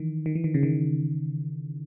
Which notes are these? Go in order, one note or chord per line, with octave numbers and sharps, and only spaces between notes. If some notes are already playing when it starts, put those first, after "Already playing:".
Already playing: D#3 E3
D#3
E3
D#3
C#3
D#3